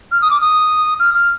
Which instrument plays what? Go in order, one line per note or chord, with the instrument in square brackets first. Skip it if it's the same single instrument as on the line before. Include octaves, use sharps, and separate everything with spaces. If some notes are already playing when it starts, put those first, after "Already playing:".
[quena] F6
D#6
D6
D#6
F6
F6